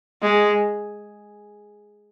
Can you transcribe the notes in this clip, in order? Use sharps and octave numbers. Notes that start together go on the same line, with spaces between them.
G#3